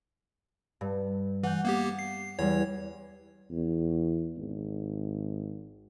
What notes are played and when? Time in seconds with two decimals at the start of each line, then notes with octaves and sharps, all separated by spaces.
0.81 G2
1.43 E3 F#5 G6
1.65 A#3 B3 G4
1.99 C7
2.39 E2 G3 C#5
3.51 E2
4.38 G#1